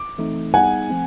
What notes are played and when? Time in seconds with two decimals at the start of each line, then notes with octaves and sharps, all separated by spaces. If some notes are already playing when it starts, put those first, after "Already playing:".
Already playing: D6
0.18 E3 A3 C4 D#4
0.54 G3 B3 D#4 G#4 F#5 G#5
0.90 F3 A3 C4